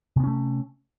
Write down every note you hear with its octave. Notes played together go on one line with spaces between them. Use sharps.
C3 A3 B3 C#4